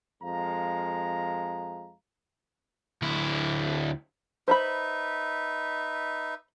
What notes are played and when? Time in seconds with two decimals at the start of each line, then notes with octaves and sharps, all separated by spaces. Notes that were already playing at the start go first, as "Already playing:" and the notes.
0.23 F2 F3 G#3 F5 A#5
3.02 D2 E4
4.48 D#4 B4 C5 E5 A#5 B5